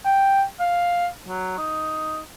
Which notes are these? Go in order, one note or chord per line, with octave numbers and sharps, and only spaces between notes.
G5
F5
F#3
D#4